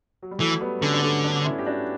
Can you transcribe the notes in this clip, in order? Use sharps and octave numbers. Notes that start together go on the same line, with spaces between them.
F#3
G3
E3 F#3 A3
G3 B3
D3 A3 C#4
D4
A3 C#4
B3 D4
C#4 E4
G4
D4 F#4